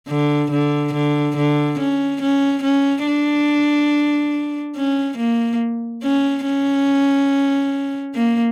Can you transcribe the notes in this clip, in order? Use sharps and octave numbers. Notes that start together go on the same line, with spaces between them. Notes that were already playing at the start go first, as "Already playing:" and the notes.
D3
D3
D3
D3
C#4
C#4
C#4
D4
C#4
A#3
C#4
C#4
A#3